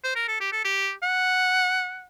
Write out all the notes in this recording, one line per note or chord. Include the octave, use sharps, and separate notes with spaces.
C5
A#4
A4
G4
A4
G4
F#5